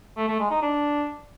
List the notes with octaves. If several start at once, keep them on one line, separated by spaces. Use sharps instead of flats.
A3
A3
G#3
D#4
D4